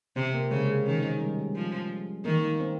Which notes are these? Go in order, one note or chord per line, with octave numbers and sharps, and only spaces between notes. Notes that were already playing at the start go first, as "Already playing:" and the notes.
C3 C4
A#3
C#3 G#3
D#3 C#4
C4
G3
G#3
F3
D#3 A#3
C4